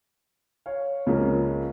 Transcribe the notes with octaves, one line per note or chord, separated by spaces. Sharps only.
C#5 F5
C#2 C#3 F3 A#3 C#4